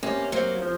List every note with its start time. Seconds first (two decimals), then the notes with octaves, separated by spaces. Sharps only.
0.03 C3 A#3 C#4
0.32 F#3 A#3 C4
0.62 F3